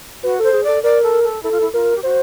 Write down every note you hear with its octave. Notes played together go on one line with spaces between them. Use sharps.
F#4 B4
A4 C5
G#4
A4 D5
A#4 D5
A4
A4
E4 A4
F4
E4
F4 A#4
G4
F#4 C5